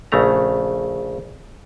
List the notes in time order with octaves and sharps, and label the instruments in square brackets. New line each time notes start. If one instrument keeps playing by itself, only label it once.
[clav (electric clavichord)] A#1 C#3 A3 A#5